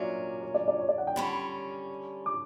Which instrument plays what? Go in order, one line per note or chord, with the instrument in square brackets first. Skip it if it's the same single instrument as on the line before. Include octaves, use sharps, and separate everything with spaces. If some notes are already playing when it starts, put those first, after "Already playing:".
Already playing: [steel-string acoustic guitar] A#2 F#3 C#4 [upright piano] D5 E5
[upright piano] C#5
D5
D5
C#5
D5
F#5
G5
[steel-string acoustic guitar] D3 G3 C#4 [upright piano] B5
[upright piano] D6